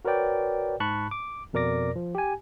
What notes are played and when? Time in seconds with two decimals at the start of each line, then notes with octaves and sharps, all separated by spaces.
0.05 F#4 A#4 B4 C#5 D5 G5
0.80 G#2 A5 B5 C#6 F#6
1.11 D6
1.53 F2 B2 A#4 D5 D6 A#6
1.96 F3
2.15 G4 G#5